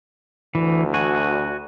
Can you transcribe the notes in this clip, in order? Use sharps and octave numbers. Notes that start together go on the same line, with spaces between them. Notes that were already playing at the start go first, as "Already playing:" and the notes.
D2 E3
F#4 G#5